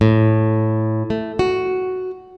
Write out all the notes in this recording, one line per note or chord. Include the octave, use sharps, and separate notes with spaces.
A2
A3
F#4